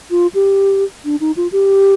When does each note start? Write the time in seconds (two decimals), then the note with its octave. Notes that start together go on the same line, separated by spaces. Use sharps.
0.11 F4
0.35 G4
1.05 D4
1.21 D#4
1.37 F4
1.52 G4